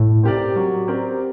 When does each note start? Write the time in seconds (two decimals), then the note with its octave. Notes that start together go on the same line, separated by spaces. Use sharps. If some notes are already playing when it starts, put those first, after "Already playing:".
Already playing: A2
0.23 C4 G4 A#4 D5
0.56 F#3
0.88 C4 G4 A#4 D5